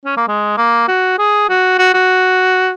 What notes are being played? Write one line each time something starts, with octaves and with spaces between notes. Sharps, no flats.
C#4
A#3
G#3
A#3
F#4
G#4
F#4
F#4
F#4